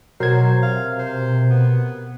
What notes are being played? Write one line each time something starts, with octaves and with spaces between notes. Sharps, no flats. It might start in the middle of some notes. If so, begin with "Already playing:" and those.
B2 F#3 A#4 C5 G#6
C3 F5
C5
B3